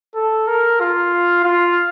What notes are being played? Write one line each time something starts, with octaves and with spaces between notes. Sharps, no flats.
A4
A#4
F4
F4